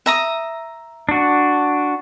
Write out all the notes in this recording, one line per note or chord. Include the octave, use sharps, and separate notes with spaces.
E5 A#5 D#6
D4 F#4